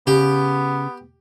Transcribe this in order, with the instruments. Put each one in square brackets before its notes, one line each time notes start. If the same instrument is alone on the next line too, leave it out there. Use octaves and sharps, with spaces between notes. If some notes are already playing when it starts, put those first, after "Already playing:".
[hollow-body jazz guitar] C#3 [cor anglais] B3 [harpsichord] G4